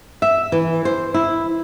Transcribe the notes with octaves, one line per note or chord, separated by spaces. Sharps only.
E5
E3
C5
E4